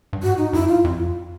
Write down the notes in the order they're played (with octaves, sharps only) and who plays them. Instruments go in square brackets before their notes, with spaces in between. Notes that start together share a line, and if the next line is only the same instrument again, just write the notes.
[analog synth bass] G2
[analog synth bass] G#2 [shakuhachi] F#4
[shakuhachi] D#4
[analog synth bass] F#2 [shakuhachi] E4
[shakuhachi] F4
[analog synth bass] F2